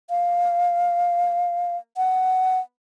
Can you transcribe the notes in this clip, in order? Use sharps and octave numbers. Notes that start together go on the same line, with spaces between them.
F5
F#5